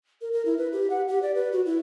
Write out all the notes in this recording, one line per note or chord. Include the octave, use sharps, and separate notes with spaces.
A#4
A#4
E4
B4
G4
F#5
G4
D5
B4
F#4
E4